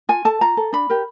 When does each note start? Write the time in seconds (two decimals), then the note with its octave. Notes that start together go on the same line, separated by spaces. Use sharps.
0.09 F4 G#5
0.25 A4 A5
0.41 F4 A#5
0.57 A4
0.73 D4 B5
0.90 G4 A#4